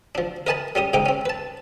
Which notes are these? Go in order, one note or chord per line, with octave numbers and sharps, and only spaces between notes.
F3 D4
A#4 B4 D#5 G#5 A5 B5
G3 C#4 G4 D#6
G#2 C3 D#4 G5 D6
C4 C#4
B4 A5